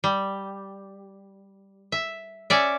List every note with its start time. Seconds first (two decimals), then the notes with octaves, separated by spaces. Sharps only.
0.04 G3
1.92 E5
2.50 C#4 D5 E5